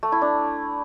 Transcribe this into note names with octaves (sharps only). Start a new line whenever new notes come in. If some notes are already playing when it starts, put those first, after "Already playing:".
A3
E4
D4